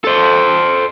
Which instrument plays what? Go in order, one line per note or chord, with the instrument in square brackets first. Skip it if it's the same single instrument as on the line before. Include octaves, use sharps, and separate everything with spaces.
[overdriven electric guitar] A4 C5